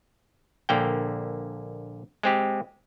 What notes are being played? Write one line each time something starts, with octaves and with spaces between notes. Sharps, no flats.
A#1 D3 A#3 G5
G#3 C4 G4